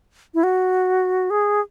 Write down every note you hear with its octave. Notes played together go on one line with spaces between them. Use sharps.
E4
F#4
G#4